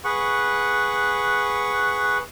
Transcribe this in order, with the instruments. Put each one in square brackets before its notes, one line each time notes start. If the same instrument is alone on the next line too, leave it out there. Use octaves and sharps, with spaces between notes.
[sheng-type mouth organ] G#4 B4 F#5 C#6